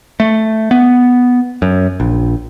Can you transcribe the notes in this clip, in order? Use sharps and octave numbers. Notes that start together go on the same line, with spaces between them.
A3
B3
F#2
A#1